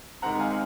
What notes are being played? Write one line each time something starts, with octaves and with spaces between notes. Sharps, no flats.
C3 D#3 G#3 C4 F#5 A#5
F5 G#5